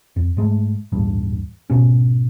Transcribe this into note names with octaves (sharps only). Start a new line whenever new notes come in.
F2
G#2 G#3 A3
D#1 A1 G2 G3
G#1 C#2 B2 C#4